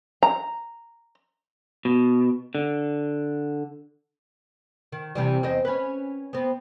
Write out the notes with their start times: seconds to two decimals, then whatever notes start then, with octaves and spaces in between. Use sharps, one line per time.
0.23 A#5
1.85 B2
2.55 D3
4.92 D#3
5.15 C3 E3 G3
5.43 E2 C4 D#5
5.65 C#4 B4
6.33 B3 C4